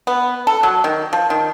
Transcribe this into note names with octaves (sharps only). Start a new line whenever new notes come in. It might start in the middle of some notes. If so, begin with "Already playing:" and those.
B3
A4
F#3
D#3
F3
D#3